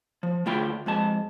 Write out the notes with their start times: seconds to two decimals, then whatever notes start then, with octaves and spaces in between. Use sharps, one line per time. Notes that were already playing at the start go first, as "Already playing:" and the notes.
0.23 F3
0.46 D2 A3 F4 G5 B5
0.86 F2 G#3 A5